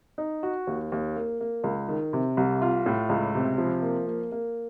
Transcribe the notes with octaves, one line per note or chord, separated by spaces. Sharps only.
D#4
F#4
D#2
D#2
A#3
A#3
C#2
D#3
C3
C2
F4
A2
C#2
C3
F3
A#3
A#3
A#3